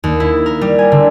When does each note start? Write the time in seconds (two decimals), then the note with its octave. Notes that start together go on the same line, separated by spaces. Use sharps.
0.04 D#2
0.20 E4
0.46 A#4
0.61 G3
0.79 G#5
0.92 D3